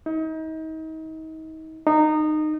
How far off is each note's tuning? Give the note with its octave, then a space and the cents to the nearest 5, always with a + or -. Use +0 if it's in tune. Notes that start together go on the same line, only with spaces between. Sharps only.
D#4 +35
D#4 -20